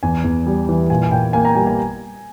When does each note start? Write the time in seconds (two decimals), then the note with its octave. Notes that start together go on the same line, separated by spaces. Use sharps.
0.03 E2 G#5
0.24 E2
0.46 G3
0.69 E3
0.90 A#2 G#5
1.03 G#5
1.11 A#2 G5
1.33 A#3 G#5
1.45 A#5
1.55 G3 G#5
1.67 G#5